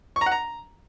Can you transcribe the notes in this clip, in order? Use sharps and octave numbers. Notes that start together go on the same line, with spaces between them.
C#6
A#5
F#5
A#5